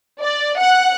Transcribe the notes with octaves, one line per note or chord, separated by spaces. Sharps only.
D5
F#5